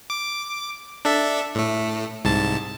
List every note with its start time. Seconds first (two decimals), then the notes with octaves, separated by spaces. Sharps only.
0.10 D6
1.05 D4 A4 E5
1.55 A2 A3
2.25 C2 G#2 A5